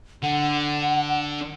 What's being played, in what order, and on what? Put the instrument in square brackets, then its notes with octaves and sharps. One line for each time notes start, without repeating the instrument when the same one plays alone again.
[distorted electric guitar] D3 [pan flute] F#5